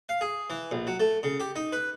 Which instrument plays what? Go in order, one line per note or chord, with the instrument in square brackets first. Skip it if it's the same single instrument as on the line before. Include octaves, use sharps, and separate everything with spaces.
[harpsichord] F5
G#4
E3
A#1
F#3
A3
C#3
G4
D#4
B4